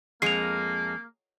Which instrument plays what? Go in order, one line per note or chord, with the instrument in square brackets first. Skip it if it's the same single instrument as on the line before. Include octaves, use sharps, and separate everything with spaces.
[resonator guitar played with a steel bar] F2 G#3 [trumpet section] A#3 [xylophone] C7 F7